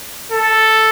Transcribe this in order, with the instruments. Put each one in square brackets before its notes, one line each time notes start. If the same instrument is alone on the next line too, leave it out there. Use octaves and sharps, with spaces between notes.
[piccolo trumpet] A4